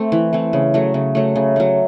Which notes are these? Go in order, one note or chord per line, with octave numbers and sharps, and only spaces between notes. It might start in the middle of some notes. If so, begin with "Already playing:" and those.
Already playing: A3 C4
E3
A3 C4
C#3
F#3 A3
C#3
F#3 A3
C#3
F#3 A3